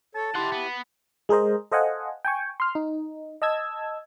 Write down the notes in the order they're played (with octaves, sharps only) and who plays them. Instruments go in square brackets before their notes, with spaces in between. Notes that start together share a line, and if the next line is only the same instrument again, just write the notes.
[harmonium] A4 C#5 [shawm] A5
[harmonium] E4 G4 [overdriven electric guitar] F#5 C6
[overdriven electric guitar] B3
[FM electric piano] G#3 G#4 A#4 C5 D#5
A4 C5 D#5 F5 F#5 G#5
G5 G#5 C#6
C6 F6
D#4
D#5 A5 E6 G#6